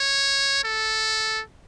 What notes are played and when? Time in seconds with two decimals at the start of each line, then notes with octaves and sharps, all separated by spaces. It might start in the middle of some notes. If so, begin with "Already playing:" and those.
Already playing: C#5
0.64 A4